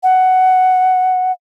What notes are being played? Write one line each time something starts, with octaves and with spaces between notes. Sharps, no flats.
F#5